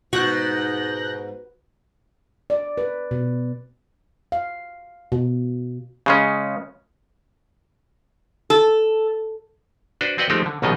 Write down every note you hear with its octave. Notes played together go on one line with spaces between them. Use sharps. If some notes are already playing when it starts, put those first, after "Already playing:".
G#2 B2 F#4 F#6 G6 A#6
D5
B4
B2
F5
B2
C#3 G#3 C#4
A4
D4 F#4 B4 C5
C4 F#4 B4 D5 D#5 G5
F3 G#3 A3 C4 D#4 G4
D3
A#1 F#2 B2 D#3 G3 D#5